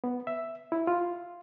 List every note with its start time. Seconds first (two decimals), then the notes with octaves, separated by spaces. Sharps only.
0.04 B3
0.27 E5
0.72 E4
0.87 F4